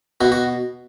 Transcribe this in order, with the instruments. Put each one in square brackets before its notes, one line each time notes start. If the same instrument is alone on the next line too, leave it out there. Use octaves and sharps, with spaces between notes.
[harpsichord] B2 F#4
F#4